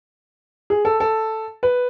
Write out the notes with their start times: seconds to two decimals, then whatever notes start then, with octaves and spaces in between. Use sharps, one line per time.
0.70 G#4
0.85 A4
1.00 A4
1.63 B4